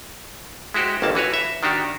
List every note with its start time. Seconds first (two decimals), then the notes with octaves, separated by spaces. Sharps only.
0.74 G#3 E4 F#4 G4 C5
1.02 G1 D#2 A#3 A5
1.15 E3 F#4 B4 C#5
1.34 E5
1.63 D#3 D4 F#4 G4